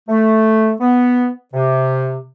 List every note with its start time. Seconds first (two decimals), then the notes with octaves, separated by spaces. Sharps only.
0.09 A3
0.80 B3
1.54 C3